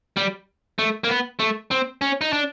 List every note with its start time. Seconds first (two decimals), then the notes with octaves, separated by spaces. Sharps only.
0.17 G3
0.79 A3
1.04 A#3
1.09 B3
1.40 A3
1.71 C4
2.01 C#4
2.21 D#4
2.33 D4